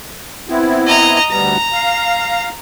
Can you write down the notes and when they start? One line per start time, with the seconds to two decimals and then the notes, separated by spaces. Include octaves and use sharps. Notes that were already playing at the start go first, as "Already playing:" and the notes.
0.49 B3 C4 E4
0.87 D#5 A#5
1.31 D2 G3 B3 A#5
1.73 F5